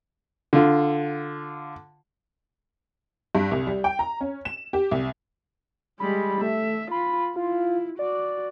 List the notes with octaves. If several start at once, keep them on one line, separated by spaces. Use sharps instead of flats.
D3 F4
G2
C2
G3
G5
A#5
C#4
E7
G4
C2
G3 G#3 B5
A3 E5
F4 B5
E4 F4
F#4 D5